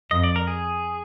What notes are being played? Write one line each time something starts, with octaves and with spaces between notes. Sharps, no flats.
F2 D#5
D5
A#4
G#4